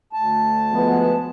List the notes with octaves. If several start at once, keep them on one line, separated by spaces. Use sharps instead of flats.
D2 A5
F3 G#3 B3